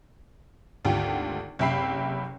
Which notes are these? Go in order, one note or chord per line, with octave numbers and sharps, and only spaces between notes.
G#1 D2 F4 G4 G5
F#1 C3 E5 G5 B5 C7